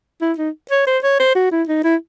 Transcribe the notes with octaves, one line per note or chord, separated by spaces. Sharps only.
E4
D#4
C#5
C5
C#5
C5
F#4
E4
D#4
E4